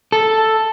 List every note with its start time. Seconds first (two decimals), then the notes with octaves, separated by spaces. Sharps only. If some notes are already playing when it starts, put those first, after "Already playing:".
0.12 A4